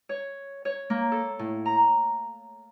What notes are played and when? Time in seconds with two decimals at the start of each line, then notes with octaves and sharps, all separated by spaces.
0.09 C#5
0.65 C#5
0.90 A#3
1.12 A4
1.39 A2
1.66 A#5